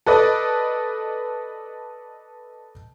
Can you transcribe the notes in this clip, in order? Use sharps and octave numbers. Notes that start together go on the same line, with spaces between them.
A4 B4 D5 D#5